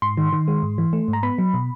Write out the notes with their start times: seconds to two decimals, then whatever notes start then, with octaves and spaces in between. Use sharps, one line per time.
0.02 G#2 C6
0.17 D#3
0.33 D#3
0.48 G#3
0.63 G#2
0.78 E3
0.93 A3
1.08 G#2
1.13 A#5
1.23 B3 B5
1.38 F#3
1.54 B2